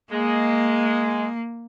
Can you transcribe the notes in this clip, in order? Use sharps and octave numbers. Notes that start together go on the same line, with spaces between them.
G#3 A#3